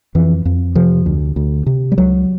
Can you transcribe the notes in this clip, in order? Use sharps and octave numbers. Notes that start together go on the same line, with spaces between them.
F2 E3
F2
C3 F3
D2
D2
C3
G3
C#2 F#3